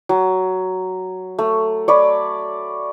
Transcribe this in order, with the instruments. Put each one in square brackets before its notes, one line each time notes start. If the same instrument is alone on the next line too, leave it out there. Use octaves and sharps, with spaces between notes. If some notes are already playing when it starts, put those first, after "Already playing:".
[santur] F#3
A3
C#5 D5 B5